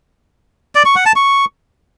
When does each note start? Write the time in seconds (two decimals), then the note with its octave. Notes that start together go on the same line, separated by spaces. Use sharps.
0.75 D5
0.85 C#6
0.95 F#5
1.06 A5
1.16 C#6